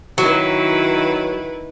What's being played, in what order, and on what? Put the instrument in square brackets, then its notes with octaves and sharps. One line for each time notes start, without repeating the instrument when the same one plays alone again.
[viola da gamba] D#3 E4 B4 [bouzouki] F#3